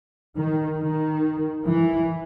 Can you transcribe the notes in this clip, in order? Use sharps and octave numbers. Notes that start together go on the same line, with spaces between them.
D#3
D#3
E3